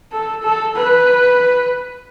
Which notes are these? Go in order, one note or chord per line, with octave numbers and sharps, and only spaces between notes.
A4
A4
B4